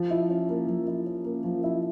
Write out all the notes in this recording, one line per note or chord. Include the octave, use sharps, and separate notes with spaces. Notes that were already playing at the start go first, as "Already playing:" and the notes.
Already playing: F3
E4
C#4
A#3
F3
E4
C#4
A#3
F3
E4